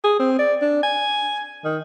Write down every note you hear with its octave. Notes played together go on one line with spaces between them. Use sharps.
G#4
C4
D5
D4
G#5
D#3